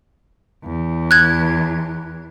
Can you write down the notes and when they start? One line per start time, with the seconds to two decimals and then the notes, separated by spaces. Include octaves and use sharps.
0.65 E2
1.11 F#6 G#6